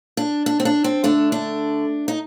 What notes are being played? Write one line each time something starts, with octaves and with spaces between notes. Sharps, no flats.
D4
D4
C4
D4
C4
D3 A3 D4
D4
D#4